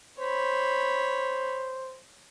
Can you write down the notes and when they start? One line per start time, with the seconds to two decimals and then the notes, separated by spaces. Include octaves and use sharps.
0.20 C5 C#5 B5